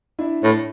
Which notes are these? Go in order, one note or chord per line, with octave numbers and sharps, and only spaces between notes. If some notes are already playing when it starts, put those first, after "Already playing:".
D4 E4
A2